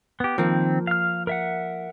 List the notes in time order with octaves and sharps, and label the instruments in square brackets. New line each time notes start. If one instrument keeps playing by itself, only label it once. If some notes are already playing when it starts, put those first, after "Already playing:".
[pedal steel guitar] B3 G4
[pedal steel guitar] D#3 C4 [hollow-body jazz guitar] F3 A#3
[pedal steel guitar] F5 F6
A#4 E5 F#5